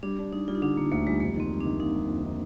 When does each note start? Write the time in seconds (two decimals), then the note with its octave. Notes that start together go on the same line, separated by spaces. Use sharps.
0.03 G3 D4
0.19 D4
0.32 G3 D#4
0.48 G3 F4
0.55 D#4
0.62 D3 D4
0.77 D3 A#3
0.92 D2 A#3
1.07 G3 G#3
1.20 F2 A#3
1.36 D#3 C4
1.51 G3
1.61 D4
1.65 D#3
1.79 A#3 D#4
1.94 G3
2.09 F2
2.24 D#3